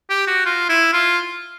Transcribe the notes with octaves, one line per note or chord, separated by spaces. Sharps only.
G4
F#4
F4
E4
F4